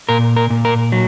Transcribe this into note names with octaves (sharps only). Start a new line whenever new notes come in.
A#2 A#4
A#4
A#2
A#4
F#3